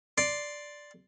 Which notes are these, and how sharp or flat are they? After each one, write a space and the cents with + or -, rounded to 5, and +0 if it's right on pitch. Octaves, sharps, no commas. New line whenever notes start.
D5 +0 C6 +0